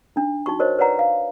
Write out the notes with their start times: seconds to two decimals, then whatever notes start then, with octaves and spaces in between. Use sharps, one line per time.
0.16 D4 D#4
0.46 D#4 F#4 C#6
0.59 F#4 A#4 C5 C#5 D#5
0.79 B4 C#5 D5 F#5 A#5
0.99 F5